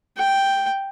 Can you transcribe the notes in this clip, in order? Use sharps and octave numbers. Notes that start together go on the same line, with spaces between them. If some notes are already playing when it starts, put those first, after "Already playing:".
G5